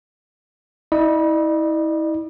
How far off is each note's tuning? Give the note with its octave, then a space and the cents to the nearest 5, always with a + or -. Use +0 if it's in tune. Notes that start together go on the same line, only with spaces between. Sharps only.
E4 -35 D5 +45